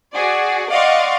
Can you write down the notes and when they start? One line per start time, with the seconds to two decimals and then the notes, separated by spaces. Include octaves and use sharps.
0.13 F#4 G#4 D5
0.70 D5 D#5 F5 F#5 C6 C#6